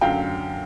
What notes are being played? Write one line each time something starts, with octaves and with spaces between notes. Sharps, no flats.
F#2 D3 F#3 F5 G5